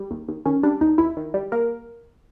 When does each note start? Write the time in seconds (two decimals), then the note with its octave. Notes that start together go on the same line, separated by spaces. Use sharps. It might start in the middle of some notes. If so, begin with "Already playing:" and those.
Already playing: G3
0.11 D#2
0.28 D#2
0.45 D#3 C#4
0.63 G3 D4
0.81 D#2 D#4
0.98 D#2 E4
1.17 D#3
1.34 G3
1.52 A#3 A#4